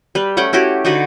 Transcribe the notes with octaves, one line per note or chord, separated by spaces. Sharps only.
G3 B4
A3 C#4 F#5 G5
C#4 E4 F#4 G4
D3 D#4 F#4 B4